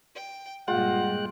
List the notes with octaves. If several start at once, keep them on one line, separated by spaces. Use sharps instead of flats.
G5
G2 A#2 G#3 F4 F#5 G5 F#6